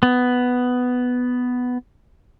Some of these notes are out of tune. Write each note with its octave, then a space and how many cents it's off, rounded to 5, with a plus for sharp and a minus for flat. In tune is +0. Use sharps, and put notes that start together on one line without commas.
B3 +5